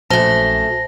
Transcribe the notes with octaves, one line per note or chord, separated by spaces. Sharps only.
A#1 F#2 A3 C5 A5 A#6